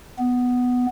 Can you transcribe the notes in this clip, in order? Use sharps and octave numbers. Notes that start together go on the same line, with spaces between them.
B3